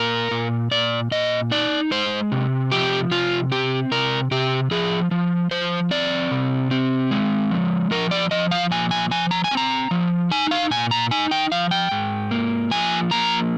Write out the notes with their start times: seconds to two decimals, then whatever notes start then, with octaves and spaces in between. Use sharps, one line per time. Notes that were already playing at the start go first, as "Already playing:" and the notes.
Already playing: A#2 A#4
0.31 A#2
0.71 A#2 D5
1.11 A#2 D#5
1.51 D#4 D5
1.91 G#3 C5
2.32 C3
2.71 F3 G4
3.11 C3 F4
3.52 C4 G4
3.92 C3 A#4
4.31 C3 G4
4.71 F3 G#4
5.11 F3
5.51 F3 C5
5.91 C4 D5
6.31 C3
6.71 C4
7.11 G#3
7.51 F3
7.91 F3 A#4
8.11 D5
8.31 F3 D#5
8.51 F5
8.71 A#2 G#5
8.91 G#5
9.11 F3 G#5
9.31 A#5
9.44 G#5
9.51 C4
9.57 A#5
9.91 F3
10.31 D#4 G#5
10.51 F5
10.71 A#2 G#5
10.91 A#5
11.11 D#4 G#5
11.31 G5
11.52 F3 F5
11.71 G5
11.91 G#2
12.31 A#3
12.71 F3 G#5
13.11 A#3 A#5